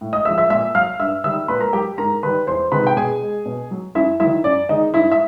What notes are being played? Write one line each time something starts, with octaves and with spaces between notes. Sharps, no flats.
A2
D#5 D#6
F3 G#3 E5 E6
E5 E6
A#2 E5 E6
F#3 F5 F6
G2 E5 E6
D#3 G3 E5 E6
A#2 B4 B5
A#4 A#5
F#3 G4 G5
G#2 A#4 A#5
D#3 G3 B4 B5
E2 C5 C6
C3 D#3 G#3 B4 B5
G5
B2 G#4 G#5
G#3
B2
F#3
F#2 E4 E5
D#3 F#3 E4 E5
F#2 D5
D#3 G#3 D#4 D#5
G2 E4 E5
E5